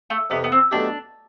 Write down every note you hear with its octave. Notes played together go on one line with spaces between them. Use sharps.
A3
F2 C3 E3 B3
B3
C4
B1 B2 A3 D4 E4 G4